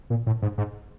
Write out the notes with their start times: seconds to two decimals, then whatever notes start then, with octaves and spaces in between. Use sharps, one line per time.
0.10 A#2
0.27 A2
0.42 G#2
0.58 G#2